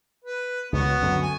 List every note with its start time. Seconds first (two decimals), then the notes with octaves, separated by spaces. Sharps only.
0.24 B4
0.72 C#2 B3 F#4
1.02 F#2 D3 F#3
1.22 G#5